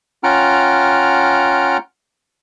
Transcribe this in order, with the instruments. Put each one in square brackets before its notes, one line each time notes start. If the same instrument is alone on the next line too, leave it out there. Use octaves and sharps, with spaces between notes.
[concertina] C#4 F4 F#5 G5 A#5 F6